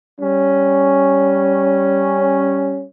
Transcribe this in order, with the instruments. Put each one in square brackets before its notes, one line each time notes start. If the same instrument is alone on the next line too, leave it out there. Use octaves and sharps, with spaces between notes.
[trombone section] G3 C#4